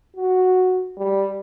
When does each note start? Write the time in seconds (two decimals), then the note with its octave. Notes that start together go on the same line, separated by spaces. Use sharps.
0.17 F#4
0.98 G3